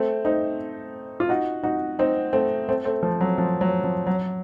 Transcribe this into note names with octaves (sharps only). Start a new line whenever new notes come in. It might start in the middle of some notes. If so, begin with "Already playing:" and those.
Already playing: A3 C4
C4 D#4
F4
D#4 F#4
D#4 F#4
C4 D#4
A3 C4
A3 C4
A3 C4
F3 A3
F#3
F3
F#3
F3
F#3